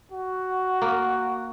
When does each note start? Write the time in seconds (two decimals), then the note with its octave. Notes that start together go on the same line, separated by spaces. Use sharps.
0.12 F#4
0.82 A#3